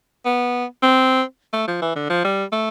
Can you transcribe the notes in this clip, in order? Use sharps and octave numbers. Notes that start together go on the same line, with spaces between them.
B3
C4
A3
F3
E3
D3
F3
G3
A3